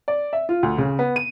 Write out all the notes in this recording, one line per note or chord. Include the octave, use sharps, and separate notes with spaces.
D5
E5
F4
D2
C#3
B3
D#7